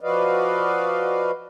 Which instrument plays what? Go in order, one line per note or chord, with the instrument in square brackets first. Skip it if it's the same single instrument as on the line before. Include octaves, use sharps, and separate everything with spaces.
[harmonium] F3 F#4 B4 D5 D#5 F5